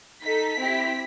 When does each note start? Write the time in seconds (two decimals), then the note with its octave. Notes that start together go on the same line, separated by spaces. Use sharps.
0.23 D#4 A4 B6
0.58 C4 E4 G4